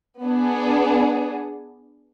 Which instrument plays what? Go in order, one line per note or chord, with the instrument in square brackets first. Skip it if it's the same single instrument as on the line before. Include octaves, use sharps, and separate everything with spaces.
[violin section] B3 D4 G#4